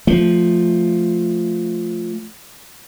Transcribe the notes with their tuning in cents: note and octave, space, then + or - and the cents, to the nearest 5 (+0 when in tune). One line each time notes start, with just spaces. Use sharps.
F3 +0 A3 +0